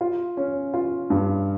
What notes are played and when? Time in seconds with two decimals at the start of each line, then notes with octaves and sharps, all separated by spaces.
0.01 F4
0.37 C#4
0.74 F4
1.10 G2